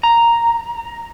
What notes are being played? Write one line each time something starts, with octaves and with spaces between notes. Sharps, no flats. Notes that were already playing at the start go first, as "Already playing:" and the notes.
A#5